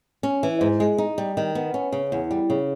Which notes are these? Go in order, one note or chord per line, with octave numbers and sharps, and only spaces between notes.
C#4
E3
G#2
G#3
D#4
G3
D#3
B3
C#4
C#3
E2
G3
C#3